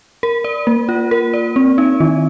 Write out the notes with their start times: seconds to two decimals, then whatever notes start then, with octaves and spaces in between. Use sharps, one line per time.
0.23 A#4
0.44 D5
0.67 A#3
0.89 F4
1.11 A#4
1.34 D5
1.56 C4
1.78 D#4
2.00 D#3